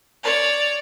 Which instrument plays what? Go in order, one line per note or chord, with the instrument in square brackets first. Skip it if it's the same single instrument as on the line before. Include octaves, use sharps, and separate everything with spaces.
[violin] C#5 D5